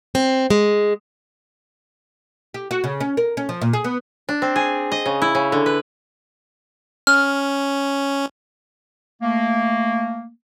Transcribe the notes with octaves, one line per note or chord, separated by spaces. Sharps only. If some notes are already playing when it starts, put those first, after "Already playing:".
C4
G#3
G4
F#4
C#3
C#4
A#4
C#4
F3
A#2
G#4
B3
D4
C4
G#4
D#5
C#3
E4
C#3
D3
B4
C#4 F6
A3 A#3